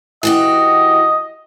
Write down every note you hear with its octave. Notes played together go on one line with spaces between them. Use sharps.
E3 F#4 G4 D#5